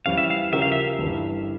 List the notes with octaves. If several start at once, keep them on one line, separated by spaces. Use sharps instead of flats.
F2 E3 G3 C#4 F5
E5
F5
C#3 F3 C#4 G4 A#4 E5
F5
E5
G1 G2 E3